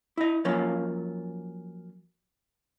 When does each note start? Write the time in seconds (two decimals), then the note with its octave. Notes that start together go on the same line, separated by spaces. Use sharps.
0.17 E4 D#5
0.45 F3 F#3 A#3 C#4 F4